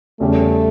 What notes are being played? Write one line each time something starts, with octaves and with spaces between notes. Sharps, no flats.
E2 C#3 G3 A3 C#4 G4